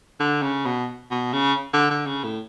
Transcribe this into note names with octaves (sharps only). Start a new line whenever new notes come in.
D3
C#3
B2
B2
C#3
D3
D3
C#3
A2